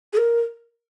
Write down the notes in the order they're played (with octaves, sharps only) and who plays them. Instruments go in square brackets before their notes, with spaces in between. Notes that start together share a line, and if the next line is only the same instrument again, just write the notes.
[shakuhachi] G#4
A#4